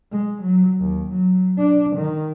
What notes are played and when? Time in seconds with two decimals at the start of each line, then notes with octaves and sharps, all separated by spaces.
0.12 G#3
0.42 F#3
0.79 D#2
1.11 F#3
1.58 D4
1.96 D#3